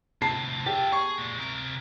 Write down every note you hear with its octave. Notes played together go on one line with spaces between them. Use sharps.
A2 C3 A5 C7
F4 G4 E5
G#4 C#6
A#2 G#3
C3 A#4